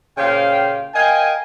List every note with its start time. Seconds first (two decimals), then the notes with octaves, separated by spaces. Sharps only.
0.18 A#2 C#3 G4 C5 F5 G5
0.95 A#4 D#5 F5 G5 G#5